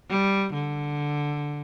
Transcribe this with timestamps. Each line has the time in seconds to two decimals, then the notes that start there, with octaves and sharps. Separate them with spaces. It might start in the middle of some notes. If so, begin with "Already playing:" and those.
0.10 G3
0.53 D3